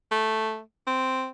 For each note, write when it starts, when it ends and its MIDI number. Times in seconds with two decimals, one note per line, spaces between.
0.12 0.60 57
0.87 1.28 60